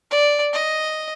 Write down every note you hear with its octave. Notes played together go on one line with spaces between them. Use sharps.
D5
D#5